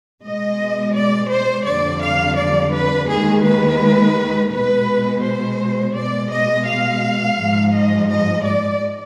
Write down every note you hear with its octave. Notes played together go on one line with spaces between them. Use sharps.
B2 G#3 D#5
D5
C5
F2 D3 G3 D5
F5
D5
B4
D#2 D#3 G#3 G#4
B4
B2 G#3 B4
C5
B2 G#3 D5
D#5
F5
G#2 F3 G#3
D#5
D#5
D5